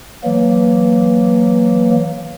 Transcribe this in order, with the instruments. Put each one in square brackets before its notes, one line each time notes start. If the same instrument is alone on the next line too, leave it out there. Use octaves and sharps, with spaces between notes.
[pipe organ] E3 F#3 A#3